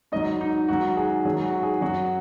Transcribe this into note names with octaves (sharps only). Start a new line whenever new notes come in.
G#2 F#3 D#5
D#4
G#2 D#3 F#3 F#4
G#4
G#2 D#3 F#3 G#4
F#4
G#4
F#2 F#3 F#4